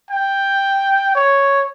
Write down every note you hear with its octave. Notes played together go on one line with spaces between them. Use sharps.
G5
C#5